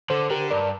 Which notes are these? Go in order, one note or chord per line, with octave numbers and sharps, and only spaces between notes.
D3 A4 C5
D3 G4 A#4
G2 A#4 D5